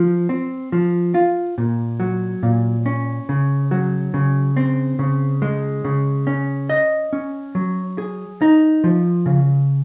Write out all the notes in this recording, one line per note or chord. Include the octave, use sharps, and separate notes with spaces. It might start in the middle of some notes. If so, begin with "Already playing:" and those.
Already playing: F3
C4
F3
F4
A#2
F#3
A#2
C#4
C#3
F#3
C#3
C4
C#3
G#3
C#3
C#4
D#5
C#4
F#3
G#4
D#4
F3
C#3